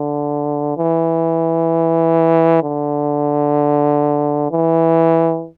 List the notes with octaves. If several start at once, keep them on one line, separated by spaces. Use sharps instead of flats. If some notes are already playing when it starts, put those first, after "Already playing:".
Already playing: D3
E3
D3
E3